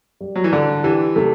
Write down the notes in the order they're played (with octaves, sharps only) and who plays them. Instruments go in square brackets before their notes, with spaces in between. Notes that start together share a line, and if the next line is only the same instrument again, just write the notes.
[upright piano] G3
[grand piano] F#3
E3
[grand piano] D3 [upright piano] D4
[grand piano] E3 [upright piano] G4
[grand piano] C3 [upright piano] A3